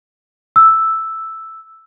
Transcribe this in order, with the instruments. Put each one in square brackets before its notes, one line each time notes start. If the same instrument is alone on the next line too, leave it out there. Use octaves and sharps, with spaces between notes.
[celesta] E6